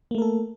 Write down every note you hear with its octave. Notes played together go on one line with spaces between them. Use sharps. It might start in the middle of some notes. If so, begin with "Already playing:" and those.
A3 A#3 A4 A#4